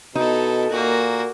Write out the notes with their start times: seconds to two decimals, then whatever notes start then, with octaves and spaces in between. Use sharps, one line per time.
0.15 B2 D#4 E4 A4
0.70 A#2 A#3 F#4